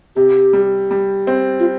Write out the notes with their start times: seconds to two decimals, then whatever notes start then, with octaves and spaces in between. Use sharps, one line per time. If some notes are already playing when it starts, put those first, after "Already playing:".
0.16 C3 G4
0.53 G3
0.91 G3
1.27 C4
1.59 F4